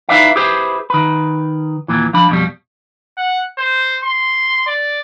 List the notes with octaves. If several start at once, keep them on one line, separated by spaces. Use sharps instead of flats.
D#4 E4 B4 D5 E5 F5
E4 G4 G#4 B4 C5 E5
D#3 B4
D#2 A#2 E3
F3 D4 B5
F2 B2 G3
F#5
C5
C6
D5